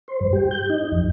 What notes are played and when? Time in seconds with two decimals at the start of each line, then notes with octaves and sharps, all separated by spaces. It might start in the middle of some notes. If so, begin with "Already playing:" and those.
0.08 C5
0.21 G2
0.33 G4
0.51 G6
0.70 D#4
0.92 F2